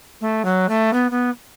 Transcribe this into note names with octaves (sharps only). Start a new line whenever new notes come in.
A3
F#3
A3
B3
B3